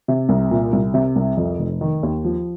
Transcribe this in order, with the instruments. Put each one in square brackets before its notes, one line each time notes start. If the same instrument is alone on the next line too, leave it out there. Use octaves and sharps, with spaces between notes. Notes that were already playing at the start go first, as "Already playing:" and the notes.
[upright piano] C3
C2
A#2
C2
C3
C2
F2
F1
D#3
D#2
F3